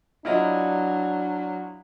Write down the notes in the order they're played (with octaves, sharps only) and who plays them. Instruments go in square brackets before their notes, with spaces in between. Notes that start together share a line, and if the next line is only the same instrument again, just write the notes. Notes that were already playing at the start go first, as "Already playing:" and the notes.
[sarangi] F#3 [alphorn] D4 [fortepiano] E4 F4 D#5